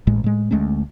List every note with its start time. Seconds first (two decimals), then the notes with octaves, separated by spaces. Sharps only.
0.07 A1 A2 G#3
0.24 A2 G#3
0.51 D2 G#3 A3 C#4